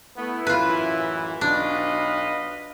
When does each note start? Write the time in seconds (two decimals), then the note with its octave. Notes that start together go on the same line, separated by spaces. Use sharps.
0.17 A3 B3 E4
0.47 A1 F#2 E3 F4 B4
1.41 B1 D4 B4 D#5 F5